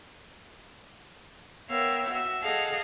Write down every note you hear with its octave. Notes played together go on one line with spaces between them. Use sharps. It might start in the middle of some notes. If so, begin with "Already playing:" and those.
B3 A#4 C#5 E5 F5 G5
F#4 E5
G#4 A4 D#5 F5 F#5